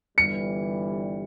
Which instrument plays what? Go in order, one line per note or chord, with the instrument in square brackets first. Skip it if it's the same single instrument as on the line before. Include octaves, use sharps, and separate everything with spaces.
[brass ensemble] G1 G2 E3 G3 [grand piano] C#7